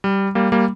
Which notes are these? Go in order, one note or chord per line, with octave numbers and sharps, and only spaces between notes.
G3
G3 A#3
G3 A#3